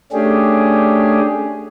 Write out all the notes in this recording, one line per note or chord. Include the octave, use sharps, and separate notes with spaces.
A3 C#4 D4 G4 G#4